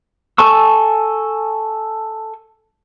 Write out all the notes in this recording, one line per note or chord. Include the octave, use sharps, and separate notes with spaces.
A4 G#5 A5 C#6 E6